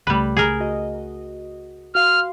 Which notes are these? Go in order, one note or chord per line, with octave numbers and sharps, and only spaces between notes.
C#2 C#3 G3 A3 B4
G#4 A#4
F#4 D#5
F#4 F5 C6 F6